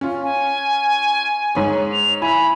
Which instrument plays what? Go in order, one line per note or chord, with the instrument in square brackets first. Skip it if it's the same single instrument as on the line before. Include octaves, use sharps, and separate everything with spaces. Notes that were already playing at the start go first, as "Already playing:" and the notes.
[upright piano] C#4 F4
[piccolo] G#5
[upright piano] G#2 C#5
[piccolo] F7
[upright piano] E4 G#5 [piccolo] B5